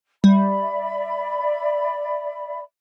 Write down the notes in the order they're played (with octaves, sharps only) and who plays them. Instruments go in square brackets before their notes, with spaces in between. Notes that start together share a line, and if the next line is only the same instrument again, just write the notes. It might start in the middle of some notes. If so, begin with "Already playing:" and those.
[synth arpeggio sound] G3 [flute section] D5 E5 B5